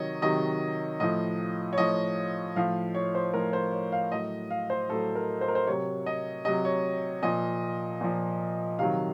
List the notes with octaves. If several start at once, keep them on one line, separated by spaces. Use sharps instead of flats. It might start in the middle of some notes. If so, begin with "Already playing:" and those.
Already playing: C3 D#3 F#3 C#5 D#5
C3 D#3 F#3 D#5
A2 F3 D#5
C#5
A2 F3 D#5
A2 F3 F5
C#5
C5
A2 F3 A#4
C5
C#5
F5
A2 F#3 D#5
F5
C5
A2 F#3 A4
A#4
C5
A#4
C5
C3 F#3 C#5
D#5
C3 F#3 D#5
C#5
A#2 F3 D#5
A#2 F3
C3 D#3 F#3 F5